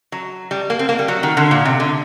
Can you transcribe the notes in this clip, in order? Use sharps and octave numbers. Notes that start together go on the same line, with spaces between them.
F#3
G3
A#3
C4
A#3
G3
F#3
D#3
D3
A#2
C3
D3